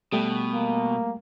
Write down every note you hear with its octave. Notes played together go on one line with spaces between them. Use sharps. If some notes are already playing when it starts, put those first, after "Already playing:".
B2 G3 A3 G5
A#3